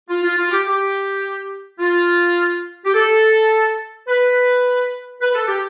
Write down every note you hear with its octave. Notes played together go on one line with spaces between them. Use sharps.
F4
F4
F4
G4
G4
F4
G4
A4
B4
B4
A4
G4